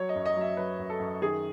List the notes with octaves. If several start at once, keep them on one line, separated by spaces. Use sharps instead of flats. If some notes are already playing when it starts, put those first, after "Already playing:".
Already playing: F#3 C#5
D#5
F#2
D#5
F#3 E5
F#3 B4
F#2
A4
F#2
D#3 G#4